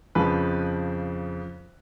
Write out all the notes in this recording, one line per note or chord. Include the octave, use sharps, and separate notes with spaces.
F2 C#3 F3 B4